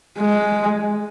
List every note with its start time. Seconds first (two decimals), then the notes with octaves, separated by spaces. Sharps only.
0.18 G#3